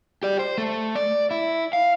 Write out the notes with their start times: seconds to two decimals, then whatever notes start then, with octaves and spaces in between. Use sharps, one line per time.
0.23 G4 D5
0.39 C5
0.58 A3
0.95 D5
1.31 E4
1.73 F5